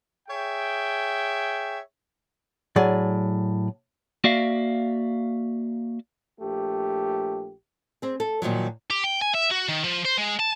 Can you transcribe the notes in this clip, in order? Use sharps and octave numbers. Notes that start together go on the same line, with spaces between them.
G#4 C#5 E5 G5
A2 F#3 G#4 D5
A#3 F#4 D5 E5 F5
A#1 A3 G4
C4 G#4
A4
A#2 D#3 F3 F#3
G4
G5
G#5
E5
F#4
D#3
F3
C5
G#3
A5